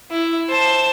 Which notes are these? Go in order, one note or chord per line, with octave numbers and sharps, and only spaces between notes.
E4
C5 A5